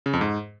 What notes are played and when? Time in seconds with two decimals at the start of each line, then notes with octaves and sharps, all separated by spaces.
0.06 C#3
0.13 F2
0.21 G#2